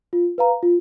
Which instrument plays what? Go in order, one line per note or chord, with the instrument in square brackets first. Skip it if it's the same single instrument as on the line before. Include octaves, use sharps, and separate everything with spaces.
[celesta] F4
B4 F5 A#5
F4